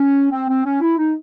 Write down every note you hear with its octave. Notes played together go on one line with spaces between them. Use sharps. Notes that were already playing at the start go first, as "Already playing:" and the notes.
Already playing: C#4
C4
C4
C#4
E4
D#4